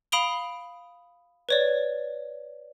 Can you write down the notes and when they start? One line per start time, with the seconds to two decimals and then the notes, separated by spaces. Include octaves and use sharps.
0.12 F5 B5 D#6 D7 F7 G7
1.49 B4 C#5 D5